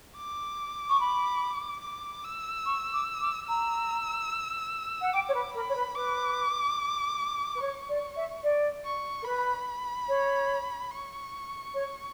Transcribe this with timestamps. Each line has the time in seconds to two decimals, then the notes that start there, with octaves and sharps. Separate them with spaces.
0.17 D6
0.89 C#6
1.00 B5
1.83 D6
2.24 E6
2.65 C#6
2.93 D6
3.21 D6
3.48 A#5 E6
5.01 F#5
5.13 G5 D6
5.29 C#5
5.34 B4
5.54 A#4 B5
5.69 C#5
5.75 B4
5.95 B4 D6
7.55 B4
7.61 C#5 C#6
7.89 D5
8.16 E5
8.43 D5
8.85 C#6
9.22 A#4
9.25 B4 B5
10.08 C#5
10.91 C#6
11.74 C#5